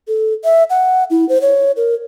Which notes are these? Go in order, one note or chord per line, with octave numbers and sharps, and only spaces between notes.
A4
E5
F#5
E4
C5
C#5
A#4